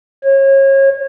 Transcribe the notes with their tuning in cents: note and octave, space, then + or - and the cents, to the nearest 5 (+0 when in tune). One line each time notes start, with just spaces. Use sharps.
C#5 -30